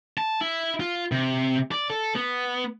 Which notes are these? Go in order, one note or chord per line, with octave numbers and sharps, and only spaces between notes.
A5
E4
F4
C3
D5
A4
B3